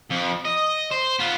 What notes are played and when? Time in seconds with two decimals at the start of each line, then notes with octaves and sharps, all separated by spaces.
0.11 F2
0.45 D#5
0.91 C5
1.19 B3 F4